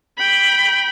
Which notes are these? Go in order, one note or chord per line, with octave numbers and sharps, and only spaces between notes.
G5 B5